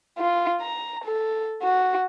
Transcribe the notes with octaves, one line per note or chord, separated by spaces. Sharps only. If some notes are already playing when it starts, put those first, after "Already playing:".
F4
A#5
A4
F#4